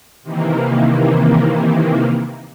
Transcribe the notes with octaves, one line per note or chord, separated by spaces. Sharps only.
C3 D#3 E3 A#3